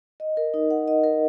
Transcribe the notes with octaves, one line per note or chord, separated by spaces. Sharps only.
D#5
A#4
D#4
F#5
D#5
A#4